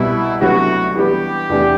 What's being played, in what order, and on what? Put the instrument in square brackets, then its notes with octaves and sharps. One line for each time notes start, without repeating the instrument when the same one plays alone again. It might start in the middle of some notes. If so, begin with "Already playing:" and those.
Already playing: [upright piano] C2 B2 G3 B3 [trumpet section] E4
[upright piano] D2 C3 F#3 B3 E4 [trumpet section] F#4
[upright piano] E3 G3 B3 [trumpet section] G4
[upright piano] E2 C3 E3 A3 D4